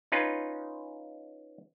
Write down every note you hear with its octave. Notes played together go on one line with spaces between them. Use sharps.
C#4 D#4 F4 B4